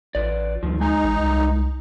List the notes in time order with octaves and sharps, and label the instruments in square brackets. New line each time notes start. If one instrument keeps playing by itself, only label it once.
[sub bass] A1 [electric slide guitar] F4 B4 D5
[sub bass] D2 [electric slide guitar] G2 D#3 F3
[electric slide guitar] G#3 G#5 [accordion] D#4
[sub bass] A1
C2